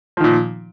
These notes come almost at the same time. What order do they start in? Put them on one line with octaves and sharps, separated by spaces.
F3 D#3 A#2